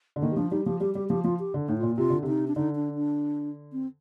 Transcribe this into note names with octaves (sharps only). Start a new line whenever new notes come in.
D3
D#3 A#3
G3
F3 D4
G3 D#4
F3 G4
G3 G4
G3 G4
F3 G4
F3 F4
G4
D3
A2 D#4
F4
A#2
C3 F4
D3
C3 D#4
D4
D3 D#4
D4
D4
C4